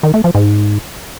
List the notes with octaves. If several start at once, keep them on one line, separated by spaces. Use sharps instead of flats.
D#3
A3
F3
G#2